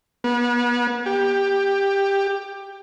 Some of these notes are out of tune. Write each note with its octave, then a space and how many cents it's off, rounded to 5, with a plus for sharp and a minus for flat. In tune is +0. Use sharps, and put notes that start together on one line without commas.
B3 -35
G4 +10